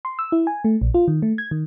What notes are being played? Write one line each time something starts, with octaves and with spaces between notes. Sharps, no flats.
C6
E6
E4
G#5
A3
A#1
F4
D#3
A3
G#6
D#3